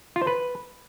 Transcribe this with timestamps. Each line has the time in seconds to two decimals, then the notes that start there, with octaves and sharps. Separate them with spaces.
0.16 F4
0.22 C5
0.27 B4